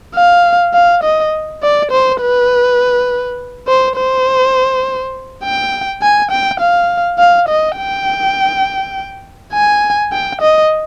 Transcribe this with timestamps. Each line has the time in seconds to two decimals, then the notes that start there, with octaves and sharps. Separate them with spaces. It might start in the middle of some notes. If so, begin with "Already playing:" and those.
0.15 F5
0.74 F5
1.04 D#5
1.63 D5
1.91 C5
2.21 B4
3.68 C5
3.96 C5
5.44 G5
6.02 G#5
6.31 G5
6.60 F5
7.19 F5
7.49 D#5
7.78 G5
9.53 G#5
10.12 G5
10.41 D#5